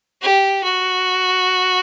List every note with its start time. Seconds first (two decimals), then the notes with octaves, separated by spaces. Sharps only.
0.22 G4
0.64 F#4